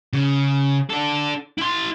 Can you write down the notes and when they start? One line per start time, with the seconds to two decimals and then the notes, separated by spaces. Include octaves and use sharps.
0.13 C#3
0.90 D4 A4
1.58 E4 C6